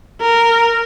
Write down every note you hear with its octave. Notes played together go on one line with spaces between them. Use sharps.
A#4